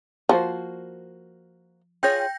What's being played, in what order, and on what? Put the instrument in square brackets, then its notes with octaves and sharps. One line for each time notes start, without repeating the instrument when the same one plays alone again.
[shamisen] F3 [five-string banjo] A#3 F#4 C5
[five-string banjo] F4 G#4 C#5 [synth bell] G5 G6 A#6